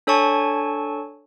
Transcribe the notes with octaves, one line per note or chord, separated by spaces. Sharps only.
D4 A4 C#5 G#5 A5 C#6